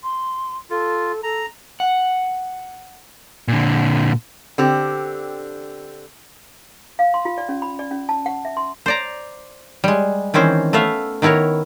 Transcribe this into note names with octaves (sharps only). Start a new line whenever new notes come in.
C6
F4 A4
A4 A#5
F#5
A#2 D3
D3 C4 G4
F5
C6
F4
D5
C#4
B5
D5
C#4
A5
F#5
E5
C6
C5 D5 A#5
G3 G#3
D#3 E3 C4 C#4 C5
A3 B3 E5 F5
D#3 B3 E4 A#4 C#5